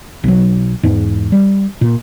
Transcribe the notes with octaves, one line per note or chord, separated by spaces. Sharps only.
B1 F#3
E2 G#2
G3
A#2